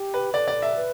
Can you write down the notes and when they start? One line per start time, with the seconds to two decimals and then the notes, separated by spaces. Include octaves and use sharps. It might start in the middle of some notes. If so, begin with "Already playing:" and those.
Already playing: G4
0.14 B4
0.34 A4 D5
0.48 D5
0.62 E5
0.76 B4